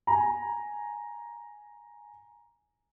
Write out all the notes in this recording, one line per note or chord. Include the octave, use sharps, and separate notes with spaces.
G#5 A#5